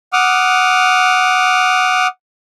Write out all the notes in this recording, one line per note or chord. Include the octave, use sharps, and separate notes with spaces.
F#5 D6 D#6 F6